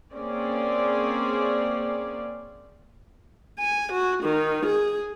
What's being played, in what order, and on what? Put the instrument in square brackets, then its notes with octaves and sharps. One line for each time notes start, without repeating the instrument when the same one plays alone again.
[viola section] A#3 C4 C#4 G#4 D5
[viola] G#5
F#4
D#3
G#4